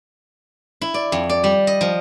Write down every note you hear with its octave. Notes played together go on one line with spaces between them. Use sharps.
E4
D5
F2
D5
G3
D#5
F3